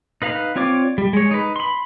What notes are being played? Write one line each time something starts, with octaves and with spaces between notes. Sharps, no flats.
D#4 B4 F5 A#5
C4 F4 C#5 D5 D6
G3
G#3 C#5
D#4 B4
B5 C6